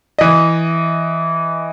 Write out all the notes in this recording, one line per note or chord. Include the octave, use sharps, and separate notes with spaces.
E3 D#5